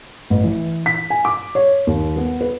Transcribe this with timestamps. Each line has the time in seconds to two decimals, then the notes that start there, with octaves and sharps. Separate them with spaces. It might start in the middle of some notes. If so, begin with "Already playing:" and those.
0.30 A1
0.44 E3
0.86 B6
1.10 G#5
1.25 D6
1.55 C#5
1.87 D#2
2.16 B3
2.41 B4